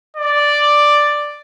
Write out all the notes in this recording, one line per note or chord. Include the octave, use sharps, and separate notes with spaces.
D5